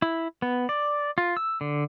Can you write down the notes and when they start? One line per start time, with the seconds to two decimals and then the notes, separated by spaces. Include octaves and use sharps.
0.02 E4
0.42 B3
0.69 D5
1.18 F4
1.37 E6
1.61 D3